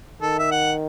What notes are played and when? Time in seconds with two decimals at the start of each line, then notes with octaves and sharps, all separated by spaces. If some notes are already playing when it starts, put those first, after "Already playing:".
0.22 D#3 A4
0.39 E5
0.52 F#5